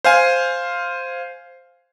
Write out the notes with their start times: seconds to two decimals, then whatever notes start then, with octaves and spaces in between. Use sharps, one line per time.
0.04 C5 F5 G#5